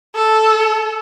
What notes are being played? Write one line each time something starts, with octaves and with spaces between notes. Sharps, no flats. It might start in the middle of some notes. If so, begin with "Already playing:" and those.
A4